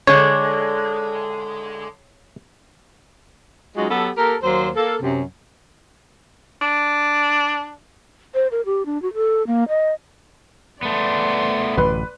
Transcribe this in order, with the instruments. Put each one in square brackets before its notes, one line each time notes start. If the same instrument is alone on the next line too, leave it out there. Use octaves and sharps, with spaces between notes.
[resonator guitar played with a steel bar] D3 G#3 D4 [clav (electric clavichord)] C#5
[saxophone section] F#3 G#3 C#4 D#4 F4 F#4
F#3 B3 G4 A4
A#3 G4 A4 A#4
D#2 F#3 A#3 C5
A#3 A4
F#2 C3
[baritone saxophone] D4
[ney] C5
A#4
G4
D4
F#4
A4
A#3
D#5
[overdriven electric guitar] A3 B3 [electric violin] D5 C6
[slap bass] A1 F#2 D3 [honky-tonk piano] B4